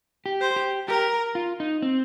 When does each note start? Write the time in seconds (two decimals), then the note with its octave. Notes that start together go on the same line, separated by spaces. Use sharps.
0.26 G4
0.41 C5
0.56 G4
0.88 G4 A#4
1.35 F4
1.60 D#4
1.82 C4